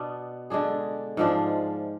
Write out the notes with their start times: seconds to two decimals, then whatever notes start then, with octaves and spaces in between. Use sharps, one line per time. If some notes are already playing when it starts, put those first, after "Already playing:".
Already playing: B2 B3 D4
0.50 D3 G#3 D4 G#4
1.17 G#2 F3 G#3 D4